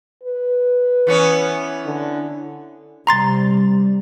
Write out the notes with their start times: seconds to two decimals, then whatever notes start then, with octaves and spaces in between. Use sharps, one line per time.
0.24 B4
1.07 E3 B3 C#4
1.86 D3
3.07 C3 G3 A#5 C6 A6